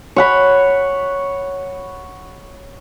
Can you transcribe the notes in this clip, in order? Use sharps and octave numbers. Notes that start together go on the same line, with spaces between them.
C#5 F#5 B5